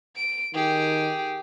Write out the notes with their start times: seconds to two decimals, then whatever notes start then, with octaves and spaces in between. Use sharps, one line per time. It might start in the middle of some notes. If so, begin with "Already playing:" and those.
0.16 D7
0.54 D#3 G4 G#4